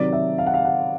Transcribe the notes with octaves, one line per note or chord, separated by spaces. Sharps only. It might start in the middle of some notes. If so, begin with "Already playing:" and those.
Already playing: C3 D#3 F#3 D5
E5
F5
F#5
F5
F#5